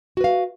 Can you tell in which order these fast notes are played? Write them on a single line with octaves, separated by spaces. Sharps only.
F#4 B4 F5